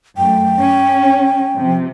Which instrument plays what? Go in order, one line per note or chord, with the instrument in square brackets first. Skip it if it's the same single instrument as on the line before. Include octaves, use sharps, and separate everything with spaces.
[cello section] F#2 A3 [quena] G5
[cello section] C#4
C3 F3